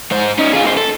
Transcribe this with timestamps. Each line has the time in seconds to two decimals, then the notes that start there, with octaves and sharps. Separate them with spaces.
0.11 G#2 C5
0.39 C#4 D#4
0.54 F4 G#4
0.65 D#2 C5
0.77 A4